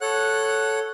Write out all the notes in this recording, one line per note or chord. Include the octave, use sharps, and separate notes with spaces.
A4 C#5 F#5 F#6